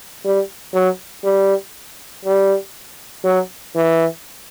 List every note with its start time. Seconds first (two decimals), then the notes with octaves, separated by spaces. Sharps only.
0.25 G3
0.74 F#3
1.24 G3
2.25 G3
3.24 F#3
3.75 E3